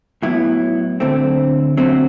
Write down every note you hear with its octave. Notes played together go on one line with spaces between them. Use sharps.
A2 F#3 B3 E4
D2 D3 A3 C4
F#2 D3 F#3 A3 C4 F#4